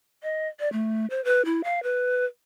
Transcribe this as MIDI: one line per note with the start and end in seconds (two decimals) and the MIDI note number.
0.23 0.48 75
0.60 0.71 74
0.73 1.06 57
1.10 1.23 72
1.24 1.42 71
1.45 1.62 64
1.64 1.82 77
1.83 2.25 71